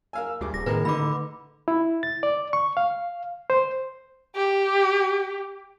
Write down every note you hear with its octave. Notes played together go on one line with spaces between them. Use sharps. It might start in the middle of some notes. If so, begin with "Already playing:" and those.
A#4 F5 G#5 E6
D2 G2 G#4 D6
D#1 A#6
D#2 A2 D#3 A#4 B4
A1 D3 D#4 B5 D6
E4
A6
D5
C#6
F5
C5
G4